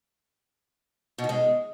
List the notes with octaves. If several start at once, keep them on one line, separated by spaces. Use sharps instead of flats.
B2
D#3
G#3